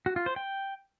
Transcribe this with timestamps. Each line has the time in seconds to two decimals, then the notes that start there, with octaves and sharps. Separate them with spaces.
0.06 F#4
0.16 F4
0.26 C5
0.36 G5